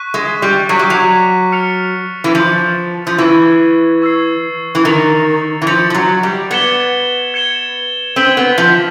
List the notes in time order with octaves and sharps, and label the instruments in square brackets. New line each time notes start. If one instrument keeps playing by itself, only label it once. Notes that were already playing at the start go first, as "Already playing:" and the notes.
Already playing: [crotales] C#6 F#6 B6 D#7
[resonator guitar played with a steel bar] G#3
G3
[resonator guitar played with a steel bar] F#3 [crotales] C#6 F#6 B6 D#7
[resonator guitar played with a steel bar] G3
F#3
[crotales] F6 A6 C#7 F7
[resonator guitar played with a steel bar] E3
[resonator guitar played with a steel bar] F3 [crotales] F6 A6 C#7 F7
[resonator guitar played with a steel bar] F3
[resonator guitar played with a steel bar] E3 [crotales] C#6 E6 G#6 C7
[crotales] C#6 E6 G#6 C7
[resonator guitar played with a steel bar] E3
[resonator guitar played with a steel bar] D#3 [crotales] A6 C#7 F7
[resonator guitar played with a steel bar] E3
[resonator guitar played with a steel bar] F3 [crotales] A6 C#7 F7
[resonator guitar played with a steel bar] F3
F#3
G3
[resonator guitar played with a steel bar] B3 [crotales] G#6 C#7 E7 G7
[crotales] G#6 C#7 E7 G7
[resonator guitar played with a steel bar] C4 [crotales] G#6 B6 D#7 F#7
[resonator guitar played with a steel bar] B3
F3